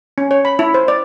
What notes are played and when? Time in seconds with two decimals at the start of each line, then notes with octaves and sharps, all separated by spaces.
0.18 C#4
0.31 C#5
0.45 B5
0.59 E4
0.74 C5
0.88 D5